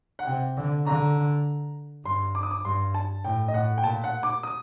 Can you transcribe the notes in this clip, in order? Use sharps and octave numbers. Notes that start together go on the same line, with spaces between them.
F#5
C3 G5
D3
D3 A#5
G2 C6
D6
D#6
D6
G2 C6
A5
A2 G5
D#5
A2 F#5
G5
A#2 A5
F#5
D6
D#6